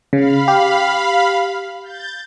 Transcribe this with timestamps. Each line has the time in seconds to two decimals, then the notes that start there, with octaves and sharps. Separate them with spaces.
0.13 C#3 F5 B5
0.48 G4
1.83 G6 A6